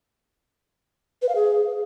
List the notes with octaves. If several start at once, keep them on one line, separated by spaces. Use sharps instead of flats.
B4
F5
G#4